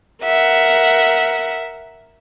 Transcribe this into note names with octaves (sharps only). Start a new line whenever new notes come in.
A#4 E5 F#5